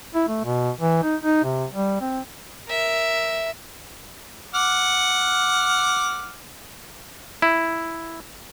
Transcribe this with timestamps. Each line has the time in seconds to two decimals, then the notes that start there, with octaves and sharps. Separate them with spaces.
0.15 E4
0.28 A3
0.44 B2
0.81 E3
1.03 D#4
1.24 D#4
1.44 C3
1.70 G3
2.01 C4
2.67 A#4 E5
4.54 F#5 D6 F6
7.42 E4